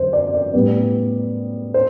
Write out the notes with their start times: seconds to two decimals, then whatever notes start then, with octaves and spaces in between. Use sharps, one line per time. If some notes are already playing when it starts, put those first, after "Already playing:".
Already playing: F#2 D3 C5
0.13 D5
0.34 D5
0.53 A2 G3 B3
1.74 C5